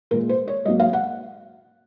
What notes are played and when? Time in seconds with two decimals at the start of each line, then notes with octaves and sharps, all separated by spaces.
0.11 A#2 G#3 A#4
0.29 C5
0.48 C#5
0.65 G#2 F#3 A#3 D#5
0.80 F5
0.93 F#5